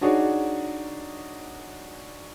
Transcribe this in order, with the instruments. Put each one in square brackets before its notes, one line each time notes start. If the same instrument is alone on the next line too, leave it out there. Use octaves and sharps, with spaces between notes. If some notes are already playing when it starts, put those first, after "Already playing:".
[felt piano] D4 D#4 F#4 G#4 C#5 D5